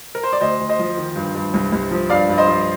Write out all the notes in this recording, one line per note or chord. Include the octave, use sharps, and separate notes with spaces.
A#4
C5
D5
D2 C5 D#5
D2
C5 D#5
F3
D#3
G2
G2
C2
C2
F3
G2 D5 F5
G2
C5 D#5
F3